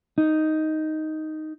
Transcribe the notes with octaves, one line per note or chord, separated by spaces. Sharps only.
D#4